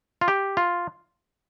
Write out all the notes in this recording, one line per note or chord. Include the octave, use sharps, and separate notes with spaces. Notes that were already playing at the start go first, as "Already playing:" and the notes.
F4
G4
F4